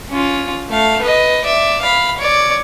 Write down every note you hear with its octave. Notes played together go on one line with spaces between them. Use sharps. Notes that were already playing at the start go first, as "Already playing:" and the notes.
C#4 F4
A3 F5
B4 D#5
D5 E5
F5 B5
C#5 D5